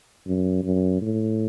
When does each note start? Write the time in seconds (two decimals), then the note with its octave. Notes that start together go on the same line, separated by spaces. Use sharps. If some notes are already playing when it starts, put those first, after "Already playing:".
0.26 F#2
0.64 F#2
1.01 A2